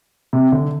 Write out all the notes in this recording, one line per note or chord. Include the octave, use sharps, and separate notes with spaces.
C3
D3